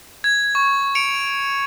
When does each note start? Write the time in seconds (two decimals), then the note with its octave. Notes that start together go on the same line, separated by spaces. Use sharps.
0.24 G#6
0.55 C#6
0.95 C#7 D7 F7